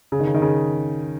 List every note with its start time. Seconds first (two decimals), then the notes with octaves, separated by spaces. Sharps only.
0.12 C#3
0.20 D#3
0.27 C#3
0.34 D#3
0.42 C#3